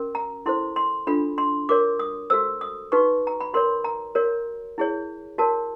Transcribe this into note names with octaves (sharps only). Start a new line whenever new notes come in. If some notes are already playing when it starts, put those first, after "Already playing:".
Already playing: C#4 F#4 A#4
A#5
E4 A4 C5 C6
C6
D4 F4 A4 B5
C6
F#4 A#4 C#5 D6
D#6
F#4 A4 C5 E6
D#6
D#4 F#4 B4 C#6
A#5
B5
F#4 A#4 C#5 C6
A#5
F#4 A#4 C#5
E4 G#4 C#5
F#4 A#4 C#5 A5